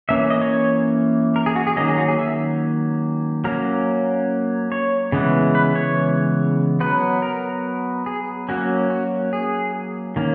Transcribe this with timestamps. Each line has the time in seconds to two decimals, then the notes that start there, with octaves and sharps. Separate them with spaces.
0.09 E3 A#3 C#4 E5
0.30 D#5
0.41 C#5
1.36 A#4
1.46 G#4
1.56 F#4
1.67 G#4
1.76 D#3 F#3 A#3 C#4 D#5
1.88 G#4
1.98 F#4
2.08 G#4
2.19 E5
3.44 F#3 A#3 C#4 A#4
4.72 C#5
5.12 C#3 E3 G#3 B3
5.55 B4
5.75 C#5
6.80 F#3 B3 B4
7.22 A#4
8.06 G#4
8.49 F#3 A#3 C#4 F#4
8.90 F#4
9.33 G#4
10.16 D#3 A#3 C#4